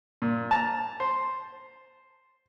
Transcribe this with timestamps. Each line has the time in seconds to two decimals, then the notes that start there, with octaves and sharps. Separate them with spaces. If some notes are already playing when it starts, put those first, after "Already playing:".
0.22 A#2
0.51 A5 A#5
1.00 C5